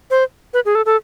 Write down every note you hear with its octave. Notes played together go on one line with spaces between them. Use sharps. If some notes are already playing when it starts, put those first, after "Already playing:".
C5
B4
G#4
A4
A4